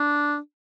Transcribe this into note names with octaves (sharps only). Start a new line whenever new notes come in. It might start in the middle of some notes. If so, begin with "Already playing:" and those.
Already playing: D4